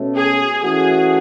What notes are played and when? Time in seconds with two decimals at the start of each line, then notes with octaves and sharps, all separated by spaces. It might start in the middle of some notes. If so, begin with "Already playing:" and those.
Already playing: B2 A3 C#4
0.16 G#4
0.62 E3 A3 C#4 F#4 G#4